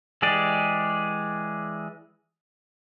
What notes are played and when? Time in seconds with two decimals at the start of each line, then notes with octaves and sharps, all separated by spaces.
0.22 E3 G#3 G4 G#4 D5